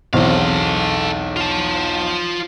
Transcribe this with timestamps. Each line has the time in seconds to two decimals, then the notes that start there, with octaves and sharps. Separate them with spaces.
0.13 B1 E2 C4 A4 F5
1.37 F4 A5